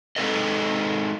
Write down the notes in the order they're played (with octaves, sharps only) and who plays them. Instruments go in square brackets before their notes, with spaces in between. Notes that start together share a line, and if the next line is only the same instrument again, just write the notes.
[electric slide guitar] G#3 C4 D#4 A4 B4 D#5